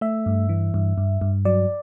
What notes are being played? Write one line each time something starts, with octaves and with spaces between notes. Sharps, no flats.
A3 E5
G2
E3
G2
G2
G2
F#3 D5